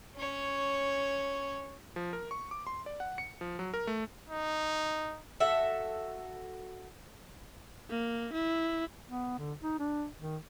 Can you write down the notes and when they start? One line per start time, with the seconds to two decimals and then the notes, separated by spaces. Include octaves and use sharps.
0.16 C#4 C#5
1.96 F3
2.13 A#4
2.31 C#6
2.51 D6
2.67 C6
2.86 D5
3.00 F#5
3.18 C#7
3.41 F3
3.59 F#3
3.74 A#4
3.87 A3
4.30 D#4
5.40 F#4 A4 E5
7.90 A#3
8.33 E4
9.09 B3
9.38 D3
9.62 D#4
9.79 D4
10.20 D#3